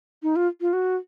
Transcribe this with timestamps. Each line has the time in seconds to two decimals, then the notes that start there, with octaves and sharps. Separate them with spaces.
0.23 D#4
0.36 F4
0.61 F4
0.73 F#4